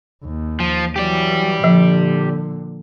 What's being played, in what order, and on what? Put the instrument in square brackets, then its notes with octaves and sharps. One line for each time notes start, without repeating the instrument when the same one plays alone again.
[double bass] D#2
[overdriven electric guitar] F3
[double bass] E3 F#3 [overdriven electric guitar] G4 D5
[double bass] A#2 D3 [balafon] F3